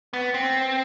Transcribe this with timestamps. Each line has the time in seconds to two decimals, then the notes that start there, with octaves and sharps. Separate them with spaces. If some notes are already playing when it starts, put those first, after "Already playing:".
0.13 B3
0.34 C4